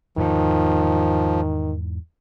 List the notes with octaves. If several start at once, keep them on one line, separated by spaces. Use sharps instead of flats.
E2 G#2 D#3 F3